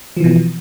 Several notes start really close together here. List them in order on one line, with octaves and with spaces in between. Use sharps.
F3 E3 B2